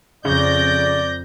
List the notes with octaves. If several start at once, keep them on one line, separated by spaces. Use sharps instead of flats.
F2 C#3 D5 G6 A#6